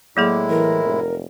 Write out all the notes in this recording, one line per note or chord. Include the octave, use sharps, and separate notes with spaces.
A2 F#3 G#3 A#3 E4 G#4 D6
E3 A#4
F1